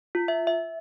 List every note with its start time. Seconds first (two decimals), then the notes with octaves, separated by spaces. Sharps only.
0.15 F4
0.28 E5
0.47 E5